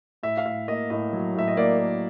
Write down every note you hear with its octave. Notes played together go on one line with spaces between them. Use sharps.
A2 E5
F5
A2 E5
A#3 D#5
A2 D#5
F#3
A2 E5
D#5
A#3 D5
A#3